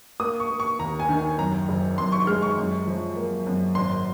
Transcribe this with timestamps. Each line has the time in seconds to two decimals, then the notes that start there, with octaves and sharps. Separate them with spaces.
0.20 A#3 D#6
0.40 C#6
0.50 A#3
0.60 C#6
0.79 D#2 A#5
1.00 G#5
1.09 D#3
1.19 G#5
1.38 F#2 A#5
1.68 F#1
1.98 F#2 C6
2.12 C#6
2.27 G#3 F6
2.42 C#6
2.57 F#2
2.87 F3
3.16 A#3
3.47 F#2
3.75 G#1 C6